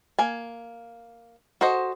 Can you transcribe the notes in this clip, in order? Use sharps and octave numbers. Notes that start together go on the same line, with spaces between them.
A#3 G#5
F#4 A4 C5 D#5